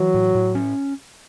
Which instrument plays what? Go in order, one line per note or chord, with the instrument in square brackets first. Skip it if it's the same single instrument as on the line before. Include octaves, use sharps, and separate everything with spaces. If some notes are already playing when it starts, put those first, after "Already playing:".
Already playing: [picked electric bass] E3 [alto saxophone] F#3
[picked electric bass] A2
A2
C#4